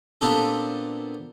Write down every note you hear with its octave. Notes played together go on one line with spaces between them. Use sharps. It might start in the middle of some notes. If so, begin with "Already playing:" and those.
A#2 B3 C4 D4 G4 A4